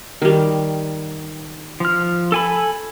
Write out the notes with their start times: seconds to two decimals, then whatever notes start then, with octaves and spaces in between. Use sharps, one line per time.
0.22 D#3 G3
1.80 F3 F6
2.32 A4 G#5 B5